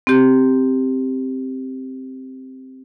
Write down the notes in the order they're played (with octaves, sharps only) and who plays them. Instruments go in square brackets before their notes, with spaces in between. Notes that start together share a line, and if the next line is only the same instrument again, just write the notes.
[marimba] C4 G4